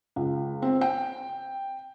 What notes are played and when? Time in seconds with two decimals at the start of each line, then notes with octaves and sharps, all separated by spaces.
0.16 C#2
0.62 C4
0.81 G5